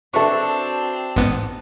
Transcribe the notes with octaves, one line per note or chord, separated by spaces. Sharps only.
C4 D4 F#4 A4 B4 E5 C#6
A1 G#2 B3